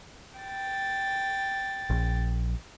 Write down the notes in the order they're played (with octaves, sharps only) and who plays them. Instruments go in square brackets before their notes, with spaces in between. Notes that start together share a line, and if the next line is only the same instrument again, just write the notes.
[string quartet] G5 A6
[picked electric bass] A#1